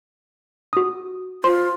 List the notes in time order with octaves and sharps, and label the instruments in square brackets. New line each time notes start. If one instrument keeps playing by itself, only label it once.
[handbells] F#4 D#6
[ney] F4 [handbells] C5 [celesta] C6